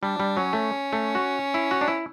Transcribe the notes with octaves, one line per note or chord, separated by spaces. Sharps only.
G3 D4
G3
F#3 C#4
A3
A3
F#4
E4
F#4
D4
E4